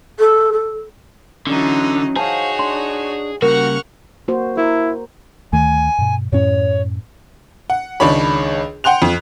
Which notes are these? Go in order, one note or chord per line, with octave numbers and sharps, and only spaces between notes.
A4
A4
D3 E3 F#3 C#4 D#4
D#4 F#4 G#4 C5 C#5 F5 A5
D4 C6
C#3 G3 A#3 F#4 A#4 F#5 C#6 F6
A#3 F#4 C5
E4 A#4
D2 D#3 A3 G#5
G2 B2
F#2 A2 C#4 C#5
F#5
C#2 D#3 D4 C#5 B5
F#5 G5 C6 F#6 F7
F2